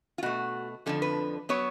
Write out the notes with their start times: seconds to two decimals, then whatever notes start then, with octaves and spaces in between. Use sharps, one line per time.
0.18 F4
0.23 B2 A3 F#4
0.86 F2 D3 F3 A4
1.02 B4
1.49 F#3 B3 C#5